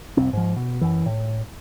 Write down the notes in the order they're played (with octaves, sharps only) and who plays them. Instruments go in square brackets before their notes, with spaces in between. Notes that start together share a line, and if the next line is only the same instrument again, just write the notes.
[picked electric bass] F1 C2 C4
G#2 F3
B2
F#2 E3
A2